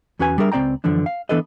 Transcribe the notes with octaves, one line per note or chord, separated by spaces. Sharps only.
E2 C#4 F#4 B4 G#5
G3 D4 G#4 A#4 E5
C#2 C4 D5 G5 A#5
F#2 D3 E3 F3 D4
F5
E3 B3 D4 A4 B4 D#5